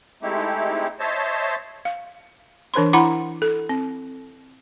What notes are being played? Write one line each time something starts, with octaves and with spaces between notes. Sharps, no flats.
G#3 A3 C4 D#4 E4 G4
C5 C#5 D#5 E5 A5
F5
E3 D4 A#4 C5 B5 C6
E4 F#5 A#5 B5 D6
A4
C4